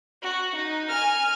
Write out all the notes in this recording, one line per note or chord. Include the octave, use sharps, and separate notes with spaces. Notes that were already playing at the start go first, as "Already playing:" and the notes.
F#4
D#4
G#5 F6